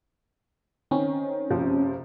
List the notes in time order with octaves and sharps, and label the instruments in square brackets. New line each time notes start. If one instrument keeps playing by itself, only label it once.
[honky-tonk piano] D#3 [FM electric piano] C4 C#4
[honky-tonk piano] F#1 C3 F3